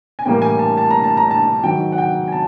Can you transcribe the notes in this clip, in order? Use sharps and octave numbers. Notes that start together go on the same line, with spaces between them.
G#5
A2 E3 G3 A#3 G5
G#5
A5
A5
A#5
A5
A#5
A5
G#2 D#3 F#3 G5
F#5
G5
G#5
A5